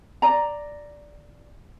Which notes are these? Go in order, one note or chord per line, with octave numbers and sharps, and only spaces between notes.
D5 A#5